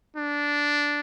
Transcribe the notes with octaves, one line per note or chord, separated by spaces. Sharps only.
D4